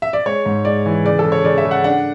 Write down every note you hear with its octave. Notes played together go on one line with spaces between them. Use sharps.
E5
D5
G#3 C#5
G#2
G#3 D5
E3
C#3 D5
A4
C#3
C#5
C#3 D5
E5
C#3
F#5
D4 F#5